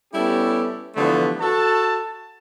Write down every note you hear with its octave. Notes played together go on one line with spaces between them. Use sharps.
G3 B3 C#4 E4 G4 A4
D3 E3 F3 G3 A3 B3
F#4 A4 A5